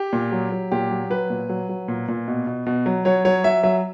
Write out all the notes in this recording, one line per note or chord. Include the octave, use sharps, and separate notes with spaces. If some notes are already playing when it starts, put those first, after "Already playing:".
Already playing: G4
A#2
F#3
F#3
A#2 G4
F#3
F#3 B4
A#2
F#3
F#3
A#2
A#2
B2
B2
B2
F#3
F#3 C#5
F#3 C#5
F#3 E5
F#3 E5